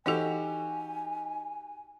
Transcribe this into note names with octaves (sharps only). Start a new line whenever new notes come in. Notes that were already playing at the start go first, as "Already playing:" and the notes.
E3 D#4 F#4 G4 A4 G#5